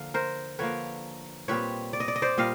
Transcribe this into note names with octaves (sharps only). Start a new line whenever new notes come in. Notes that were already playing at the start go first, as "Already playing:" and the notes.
Already playing: D3 F3 A#3 F5
A#4 C5
D3 F3 A#3 B4 C#5
A#2 G3 C4 B4 C#5
D5
D#5
D5
D#5
C5 D5
A#2 G3 D#5 F5